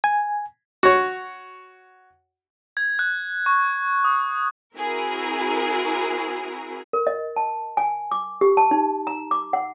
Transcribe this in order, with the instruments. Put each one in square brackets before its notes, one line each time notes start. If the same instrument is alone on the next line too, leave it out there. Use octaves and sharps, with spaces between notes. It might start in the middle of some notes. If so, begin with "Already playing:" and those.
[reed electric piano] G#5
[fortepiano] F#4 C#5
[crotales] G#6
F#6
C#6
D#6
[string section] C4 E4 F#4 G#4 A#4
[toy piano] A#4
D#5
A5
G#5
D6
G4
A5
D#4
A#5
D6
F#5